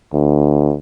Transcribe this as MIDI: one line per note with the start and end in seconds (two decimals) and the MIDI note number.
0.14 0.75 38